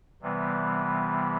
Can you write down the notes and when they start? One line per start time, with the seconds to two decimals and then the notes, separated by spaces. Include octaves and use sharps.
0.21 C3 E3 G3 B3